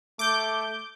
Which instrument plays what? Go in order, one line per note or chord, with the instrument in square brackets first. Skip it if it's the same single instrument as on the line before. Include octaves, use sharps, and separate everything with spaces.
[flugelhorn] A3 [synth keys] D6 G6